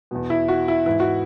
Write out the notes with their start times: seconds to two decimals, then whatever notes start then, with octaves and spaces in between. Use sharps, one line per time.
0.11 E2 B2
0.30 E4
0.48 F#4
0.68 E4
0.86 G#2 E3 E4
1.00 F#4